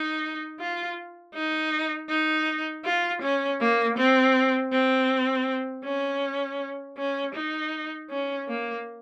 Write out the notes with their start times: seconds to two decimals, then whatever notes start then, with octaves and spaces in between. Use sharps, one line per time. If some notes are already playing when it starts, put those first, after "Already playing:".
Already playing: D#4
0.60 F4
1.35 D#4
2.09 D#4
2.85 F4
3.22 C#4
3.60 A#3
3.98 C4
4.72 C4
5.85 C#4
6.98 C#4
7.35 D#4
8.10 C#4
8.48 A#3